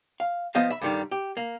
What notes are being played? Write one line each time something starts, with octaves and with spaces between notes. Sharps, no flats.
F5
F3 B3 C5 D#5 F5
E5 B5
G2 D3 D#3 G3
G4
A#3